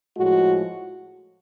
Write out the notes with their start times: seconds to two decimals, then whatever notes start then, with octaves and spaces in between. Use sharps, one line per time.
0.15 A2 F3 G#3 F#4